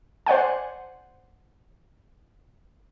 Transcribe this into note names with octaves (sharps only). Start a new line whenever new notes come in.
C5 D5 F#5 G#5